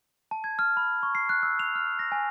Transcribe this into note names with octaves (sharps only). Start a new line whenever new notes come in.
A5
G#6
F6
B5
C#6
C7
F#6
E6
F7
F6
A#6
G#5